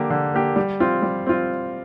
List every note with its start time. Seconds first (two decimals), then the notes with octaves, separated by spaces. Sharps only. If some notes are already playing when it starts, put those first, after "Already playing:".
Already playing: D3 A#3 G4
0.10 D3
0.34 A#3 G4
0.56 G3
0.80 C4 F4
1.02 G3
1.26 C4 F4